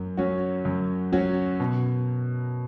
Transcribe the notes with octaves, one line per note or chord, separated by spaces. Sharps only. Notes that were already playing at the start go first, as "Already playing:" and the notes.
Already playing: F#2
F#3 C#4 F#4
F#2
F#3 C#4 F#4
B2